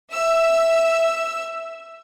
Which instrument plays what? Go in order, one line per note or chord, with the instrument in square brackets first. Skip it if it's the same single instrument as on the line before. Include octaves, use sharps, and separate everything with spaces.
[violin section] E5 E6